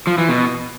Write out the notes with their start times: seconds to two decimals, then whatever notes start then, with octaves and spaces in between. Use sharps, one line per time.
0.07 F3
0.18 E3
0.29 B2